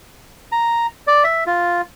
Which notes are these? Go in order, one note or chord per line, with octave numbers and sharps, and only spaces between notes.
A#5
D5
E5
F4